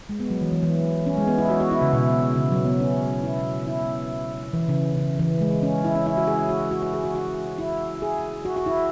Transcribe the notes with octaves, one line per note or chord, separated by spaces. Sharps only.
G#3
B3
F#3
E3
E3
E3
C#4
G#3
B3
E4
F#4
F#4
E4
C#3
B2
C#3
F#3
B3
C#4
E4
E4
E3
C#3
C#3
E3
G#3
C#4
E4
C#4
E4
F#4
G#4
F#4
F#4
F#4
G#4
F#4
F#4
E4
G#4
F#4
F#4
E4